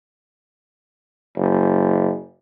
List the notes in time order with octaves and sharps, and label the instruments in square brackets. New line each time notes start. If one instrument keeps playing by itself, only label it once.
[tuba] F#1